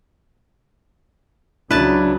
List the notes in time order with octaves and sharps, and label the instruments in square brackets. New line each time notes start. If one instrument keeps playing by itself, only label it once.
[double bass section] C#2 C#3 F#3 [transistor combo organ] D4 [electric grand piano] E4 [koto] B4 A5